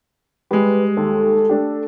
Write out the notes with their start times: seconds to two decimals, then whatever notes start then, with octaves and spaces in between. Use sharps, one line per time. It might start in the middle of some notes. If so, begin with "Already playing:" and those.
0.51 G3 G#3 G4 B4
0.97 D#2 A4
1.49 A3 D4 G4